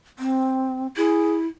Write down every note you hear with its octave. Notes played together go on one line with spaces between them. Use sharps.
C4
E4 G#4